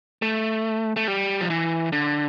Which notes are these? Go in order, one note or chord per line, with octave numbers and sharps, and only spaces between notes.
A3
A3
G3
F3
E3
D3